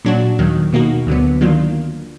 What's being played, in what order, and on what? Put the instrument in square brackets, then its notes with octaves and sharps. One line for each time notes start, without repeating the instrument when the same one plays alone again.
[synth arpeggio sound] A#2 F#3 D4 F#4
D#2 D#3 F#3
B2 A#3 D#4 F#4
D2 D3 F#3 B3
D#3 F#3 A#3 D4 F4